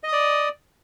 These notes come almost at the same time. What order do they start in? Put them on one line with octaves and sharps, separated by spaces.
D#5 D#6 D5